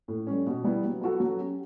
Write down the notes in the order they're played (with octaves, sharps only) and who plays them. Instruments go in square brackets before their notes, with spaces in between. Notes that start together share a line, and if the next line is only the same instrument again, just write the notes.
[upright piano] A2
G3 C#4
B2
G3 B3 E4
F#3
B3 F#4 A4
F#3
C#4 G4